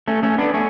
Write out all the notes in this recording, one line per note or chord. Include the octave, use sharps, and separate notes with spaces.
A3 C#4
A3 C#4
B3 D4
A3 C#4